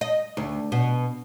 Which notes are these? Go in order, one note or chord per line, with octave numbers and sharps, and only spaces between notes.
D#5
D2
B2